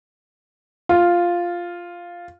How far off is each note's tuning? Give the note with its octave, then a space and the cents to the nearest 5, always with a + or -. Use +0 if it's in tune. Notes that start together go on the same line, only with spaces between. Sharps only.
F4 +0